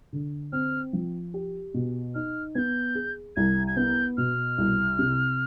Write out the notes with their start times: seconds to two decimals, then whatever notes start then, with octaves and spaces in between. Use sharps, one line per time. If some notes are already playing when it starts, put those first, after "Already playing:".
0.13 D3
0.52 C4 F6
0.93 F3
1.34 G4
1.74 B2
2.15 D#4 F6
2.55 B3 G6 G#6
2.95 G#4
3.36 C2 G#6
3.67 G#6
3.76 B3 G6
4.17 B2 F6
4.58 C2
4.99 C3